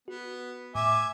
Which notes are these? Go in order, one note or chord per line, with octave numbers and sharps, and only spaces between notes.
B3 F#4
A2 E5 G#5 D6